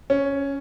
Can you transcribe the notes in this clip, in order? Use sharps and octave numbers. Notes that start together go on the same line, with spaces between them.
C#4